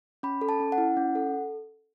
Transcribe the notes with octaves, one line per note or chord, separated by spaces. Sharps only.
C#4 B5
A4
A5
C#4
F#5
E4
C#4
A4